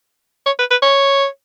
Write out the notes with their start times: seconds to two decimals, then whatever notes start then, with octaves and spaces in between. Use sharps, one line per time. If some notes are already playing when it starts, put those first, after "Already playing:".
0.46 C#5
0.59 B4
0.71 B4
0.82 C#5